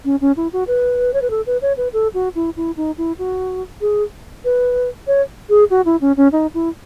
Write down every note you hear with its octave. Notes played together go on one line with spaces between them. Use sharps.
C#4
C#4
E4
F#4
B4
C#5
B4
A4
B4
C#5
B4
A4
F#4
E4
E4
D#4
E4
F#4
G#4
B4
C#5
G#4
F#4
E4
C#4
C#4
D#4
E4